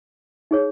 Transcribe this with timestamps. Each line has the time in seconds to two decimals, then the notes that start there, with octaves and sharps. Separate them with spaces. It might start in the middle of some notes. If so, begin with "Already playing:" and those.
0.51 D#4 G#4 C#5